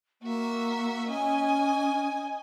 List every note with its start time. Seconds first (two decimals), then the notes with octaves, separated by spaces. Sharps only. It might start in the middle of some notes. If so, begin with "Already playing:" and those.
0.22 A#3 F#4 E5
1.07 C#4 D#5 G#5